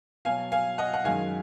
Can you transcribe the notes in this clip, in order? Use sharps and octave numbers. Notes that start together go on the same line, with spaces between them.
B2 F#3 F5 G#5
F5 G#5
D#5 F#5
F#5
F#2 D#3 G#3 F5 G#5